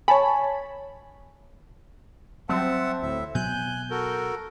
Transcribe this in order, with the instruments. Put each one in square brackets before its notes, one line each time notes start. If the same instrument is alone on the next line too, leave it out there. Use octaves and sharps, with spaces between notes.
[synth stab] C#5 A5 B5 [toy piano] G#5
[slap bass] F#3 G3 [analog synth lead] C4 [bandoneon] E5 F#5 A5
[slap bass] D2 [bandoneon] A2 E5
[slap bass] B2 F#3 [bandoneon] G#5 F#6 [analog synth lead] G6
[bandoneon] F#4 A4 A#4